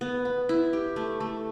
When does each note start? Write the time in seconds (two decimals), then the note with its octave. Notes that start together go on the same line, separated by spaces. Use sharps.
0.01 B3
0.25 B3
0.49 E4
0.73 G4
0.96 A3
1.20 A3